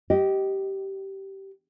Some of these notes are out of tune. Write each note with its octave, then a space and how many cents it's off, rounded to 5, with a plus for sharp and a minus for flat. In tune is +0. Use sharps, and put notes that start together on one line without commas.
G4 -15 D#5 +0